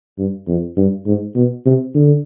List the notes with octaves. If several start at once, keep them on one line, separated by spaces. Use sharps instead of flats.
G2
F2
G2
G#2
B2
C3
D3